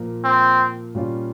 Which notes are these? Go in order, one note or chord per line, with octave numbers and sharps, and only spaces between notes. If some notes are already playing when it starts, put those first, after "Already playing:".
Already playing: A#2 F3 A#3
C4
A#2 G3 C#4 F4